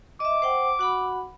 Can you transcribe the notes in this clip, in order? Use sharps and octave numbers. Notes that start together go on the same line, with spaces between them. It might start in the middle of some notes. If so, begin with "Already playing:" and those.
D#5 E5 D6
C5 F#5 G5
F#4 F#5 B5